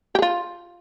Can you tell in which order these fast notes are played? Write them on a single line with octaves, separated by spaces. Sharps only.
G4 G#4 F4